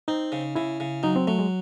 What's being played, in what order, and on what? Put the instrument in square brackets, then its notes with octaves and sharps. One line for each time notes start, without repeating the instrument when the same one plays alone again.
[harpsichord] C4 [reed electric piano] D#4
[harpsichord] C#3
[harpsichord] C#3 [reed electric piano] E4
[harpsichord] C#3
[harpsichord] F#3 [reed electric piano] D#4
[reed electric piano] C4
[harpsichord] F#3 [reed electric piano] A3
[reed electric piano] G#3